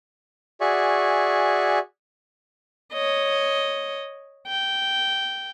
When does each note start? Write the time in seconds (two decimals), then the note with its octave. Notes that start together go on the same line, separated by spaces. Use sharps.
0.61 F#4 G#4 D5 E5 G#5 C#6
2.93 C#5 D#5
4.48 G5